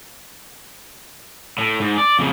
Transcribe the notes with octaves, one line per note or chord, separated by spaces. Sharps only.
A2
G#2
D5
F2 C#3